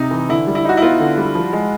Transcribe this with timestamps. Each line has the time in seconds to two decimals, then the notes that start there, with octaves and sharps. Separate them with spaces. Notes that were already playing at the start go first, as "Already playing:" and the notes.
Already playing: C3 D#4
0.11 E3
0.29 D3 E4
0.47 G3
0.55 E4
0.65 D#4 F#4
0.77 E4
0.82 B3 F4
1.00 D3
1.17 G3
1.35 F3
1.53 G#3